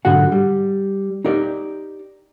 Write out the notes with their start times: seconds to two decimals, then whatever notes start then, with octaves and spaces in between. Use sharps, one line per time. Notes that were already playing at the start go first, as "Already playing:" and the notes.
0.05 B1 G#2 D3 F#4 F#5
0.32 G3
1.25 D#4 G4 A#4 D5